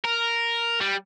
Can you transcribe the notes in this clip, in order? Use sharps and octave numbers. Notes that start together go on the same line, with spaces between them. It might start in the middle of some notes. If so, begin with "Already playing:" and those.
A#4
G3